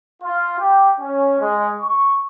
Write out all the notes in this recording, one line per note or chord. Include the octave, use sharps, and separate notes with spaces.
F4
G4
C#4
G#3
C#6